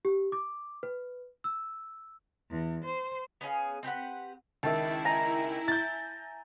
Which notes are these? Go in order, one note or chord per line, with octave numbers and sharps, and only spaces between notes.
G4
D6
B4
E6
E2
C5
B3 C#4 G#4 F5
C4 G4 B4 F#5
C#2 D#3 E4 E5 A5
G#5 A#5
G6 A6